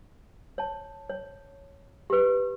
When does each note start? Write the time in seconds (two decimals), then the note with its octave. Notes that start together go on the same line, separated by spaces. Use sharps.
0.58 C#5 A5
1.10 C#5
2.10 G4 B4